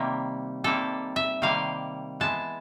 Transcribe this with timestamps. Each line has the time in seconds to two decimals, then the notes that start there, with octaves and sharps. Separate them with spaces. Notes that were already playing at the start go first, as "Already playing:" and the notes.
Already playing: C3 D#3 G3 A#3
0.64 C3 D#3 G3 A#3 A4
1.16 E5
1.42 C3 D#3 G3 A#3 F5
2.20 E3 G#3 B3 A5